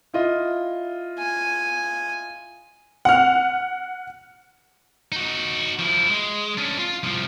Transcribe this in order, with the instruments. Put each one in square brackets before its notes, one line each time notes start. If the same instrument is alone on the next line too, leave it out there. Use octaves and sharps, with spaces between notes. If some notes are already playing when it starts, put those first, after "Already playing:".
[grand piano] E4 F4 D#5
[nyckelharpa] G#5
[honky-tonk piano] F#5 F6
[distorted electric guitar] D#4 F#4
F3 E4
G#3
C#4 D4
F4
C2 F3